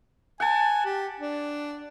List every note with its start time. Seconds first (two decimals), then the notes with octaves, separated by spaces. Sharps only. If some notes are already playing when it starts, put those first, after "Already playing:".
0.40 F#5 G#5 A5
0.85 G4
1.20 D4